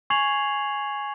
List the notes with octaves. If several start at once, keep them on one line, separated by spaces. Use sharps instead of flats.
G#5 C#6 G#6 C7 F7 F#7